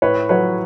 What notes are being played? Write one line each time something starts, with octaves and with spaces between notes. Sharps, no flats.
A2 B4 C#5
F#3 B4 C#5